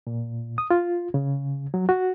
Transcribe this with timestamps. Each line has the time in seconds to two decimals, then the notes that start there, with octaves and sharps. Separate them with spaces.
0.07 A#2
0.58 D#6
0.70 F4
1.14 C#3
1.74 F#3
1.89 F#4